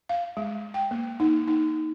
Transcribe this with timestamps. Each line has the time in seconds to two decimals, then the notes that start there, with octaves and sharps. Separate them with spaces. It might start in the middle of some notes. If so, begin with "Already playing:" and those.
0.09 F5
0.37 G#3
0.74 G5
0.91 A#3
1.20 D#4
1.48 D#4